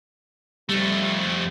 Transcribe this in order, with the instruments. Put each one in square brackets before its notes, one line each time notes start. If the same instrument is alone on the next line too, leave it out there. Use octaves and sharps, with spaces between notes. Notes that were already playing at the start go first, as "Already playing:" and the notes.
[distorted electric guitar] F2 A3 [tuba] G3